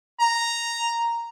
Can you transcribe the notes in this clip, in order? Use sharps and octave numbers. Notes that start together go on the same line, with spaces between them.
A#5